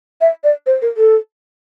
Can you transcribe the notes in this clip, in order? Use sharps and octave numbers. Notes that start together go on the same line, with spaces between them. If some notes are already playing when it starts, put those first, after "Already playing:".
E5
D5
C5
A#4
A4